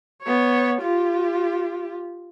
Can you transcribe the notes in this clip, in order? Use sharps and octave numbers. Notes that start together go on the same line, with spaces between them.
B3 C#5
F4 G4